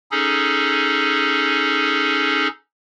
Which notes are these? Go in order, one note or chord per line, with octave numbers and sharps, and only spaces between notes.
C#4 D#4 G#4 A4